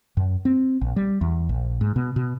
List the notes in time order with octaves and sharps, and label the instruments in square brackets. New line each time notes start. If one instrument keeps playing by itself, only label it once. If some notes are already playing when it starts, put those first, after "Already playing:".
[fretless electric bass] F#2
C4
A#1
G3
E2
A#1
G#2
B2
B2